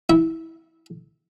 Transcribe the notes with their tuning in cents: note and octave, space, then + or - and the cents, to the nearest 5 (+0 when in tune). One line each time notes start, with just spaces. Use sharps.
E4 -20